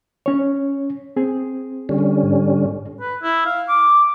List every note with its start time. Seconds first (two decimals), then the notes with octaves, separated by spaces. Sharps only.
0.26 C#4 C#5
1.16 C4 G#4
1.89 D3 G3 C#4
2.23 G#2
3.01 B4
3.23 E4
3.46 F5
3.69 D6